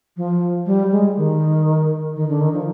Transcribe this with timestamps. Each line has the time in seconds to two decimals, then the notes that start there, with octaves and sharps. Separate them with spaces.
0.17 F3
0.66 G3
0.91 G#3
1.17 D#3
2.16 D#3
2.29 D3
2.41 D#3
2.54 F3